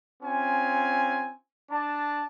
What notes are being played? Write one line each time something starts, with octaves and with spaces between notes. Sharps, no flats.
C4 C#4 F4 G#5
D4 A5